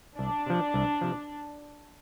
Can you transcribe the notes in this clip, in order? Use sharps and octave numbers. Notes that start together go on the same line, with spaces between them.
C2 D4
C3 F3
C2
C3 F3